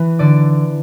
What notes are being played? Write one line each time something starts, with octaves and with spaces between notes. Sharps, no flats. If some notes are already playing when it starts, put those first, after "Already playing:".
Already playing: E3 B4
D3 D5